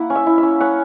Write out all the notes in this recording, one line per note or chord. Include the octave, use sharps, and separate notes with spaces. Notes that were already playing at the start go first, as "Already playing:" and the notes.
Already playing: A#3 E4 F#5
C#4
E5
E4
E5
C#4
C#4 F#5